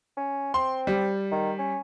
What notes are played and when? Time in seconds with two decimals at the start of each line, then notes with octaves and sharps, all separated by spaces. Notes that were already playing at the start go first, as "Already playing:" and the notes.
0.17 C#4
0.54 C4 C6
0.87 G3
1.32 D#3
1.59 C#4